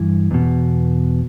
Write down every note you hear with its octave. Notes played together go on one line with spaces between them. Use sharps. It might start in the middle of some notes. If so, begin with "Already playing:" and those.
Already playing: G2 E3
E2 B2